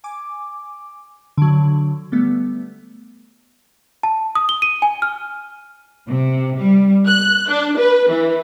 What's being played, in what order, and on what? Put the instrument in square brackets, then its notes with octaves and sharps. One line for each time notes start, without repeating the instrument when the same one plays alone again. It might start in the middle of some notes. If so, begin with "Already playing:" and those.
[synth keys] G#5 D6
D3 F#3
G3 A3 B3
[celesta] A5
D#6
G7
D#7
G#5
F6
[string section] C3
G3
F#6
D4
B4
E3